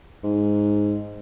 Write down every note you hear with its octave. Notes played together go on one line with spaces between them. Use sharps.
G#2